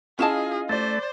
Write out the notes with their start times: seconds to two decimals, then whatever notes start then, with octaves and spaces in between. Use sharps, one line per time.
0.19 C#4 E4 F4 G#4 D#5 A5
0.69 A3 C5 D5 A6